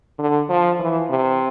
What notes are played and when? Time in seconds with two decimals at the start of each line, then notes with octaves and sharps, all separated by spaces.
0.19 D3
0.49 F3
0.79 E3
1.10 C3